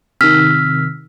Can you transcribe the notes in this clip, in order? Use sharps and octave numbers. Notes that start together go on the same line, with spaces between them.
C3 D#3 E6 F6 B6